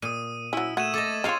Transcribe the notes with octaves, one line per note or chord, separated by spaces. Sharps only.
A#2 D#6 D#7
F#3 C#4 E4 E6
A3 F#4 G#6 D#7 E7
A4 D#5 D6 A6 D#7
D#4 F4 G#4 C#5 F5 G5